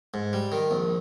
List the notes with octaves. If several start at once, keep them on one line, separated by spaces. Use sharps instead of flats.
G#2
G3
D#3
A#1